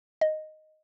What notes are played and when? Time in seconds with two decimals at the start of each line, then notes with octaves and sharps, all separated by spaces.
0.21 D#5